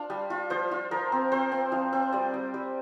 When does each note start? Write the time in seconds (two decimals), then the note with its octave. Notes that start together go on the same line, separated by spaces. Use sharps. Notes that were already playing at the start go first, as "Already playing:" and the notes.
Already playing: D4 F4 F5
0.10 G3
0.30 F4
0.50 F3 C5
0.71 F4
0.91 F3 A#4
1.12 C4
1.32 C4 C5
1.52 C4
1.72 F3 F5
1.93 C4
2.13 G3 D5
2.34 G3
2.54 G3